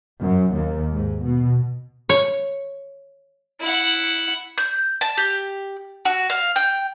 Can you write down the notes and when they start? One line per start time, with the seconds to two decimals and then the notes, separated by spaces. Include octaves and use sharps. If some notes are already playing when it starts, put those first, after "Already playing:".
0.20 F#2
0.53 D#2
0.92 G#2
1.24 B2
2.09 C#5
3.61 E4 F#5
4.58 G6
5.01 A5
5.18 G4
6.05 F#4
6.30 F5
6.56 G5